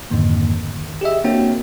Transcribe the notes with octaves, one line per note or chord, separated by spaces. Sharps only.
F2 G#2 D3 D#3 A#3
D#3
G4 G#4 D#5 E5
A#3 C4 D4 F#4 C#5 G5